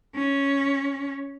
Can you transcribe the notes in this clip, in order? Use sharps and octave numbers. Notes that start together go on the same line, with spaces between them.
C#4